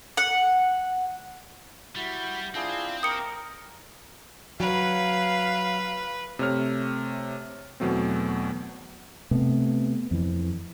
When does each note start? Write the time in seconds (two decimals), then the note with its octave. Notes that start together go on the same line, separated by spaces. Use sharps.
0.17 F#5
1.96 G3 E4 F#4
2.54 C4 D4 E4 F4 G#4
3.03 A#4 G5 D6 D#6 C#7
4.60 F#3 B4 F5
6.39 C3 A3 C#5 F6
7.80 E2 B2 F#3 A3 C4
9.31 C3 A3 B3
10.11 F2 E3